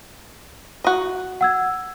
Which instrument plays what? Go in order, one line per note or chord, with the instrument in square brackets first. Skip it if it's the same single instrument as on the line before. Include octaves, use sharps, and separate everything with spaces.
[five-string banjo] F#4 D#5
[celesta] F#5 E6 G#6